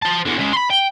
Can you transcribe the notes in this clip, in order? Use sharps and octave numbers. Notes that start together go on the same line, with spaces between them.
C5 A5
E2 D3
C#3 G#3
B5 C6
G5